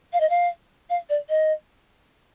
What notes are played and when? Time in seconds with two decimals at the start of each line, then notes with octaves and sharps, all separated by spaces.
0.13 F5
0.20 D#5
0.30 F5
0.90 F5
1.09 D5
1.29 D#5